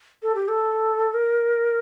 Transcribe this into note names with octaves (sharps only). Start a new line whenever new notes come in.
A4
G4
A4
A#4